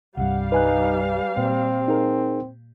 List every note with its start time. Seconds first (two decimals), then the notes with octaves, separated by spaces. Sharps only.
0.17 C2 G2 G3 F5 F#5
0.52 D#4 B4 G#5 F#6
1.37 A#2 C4
1.88 D#4 G#4 A#4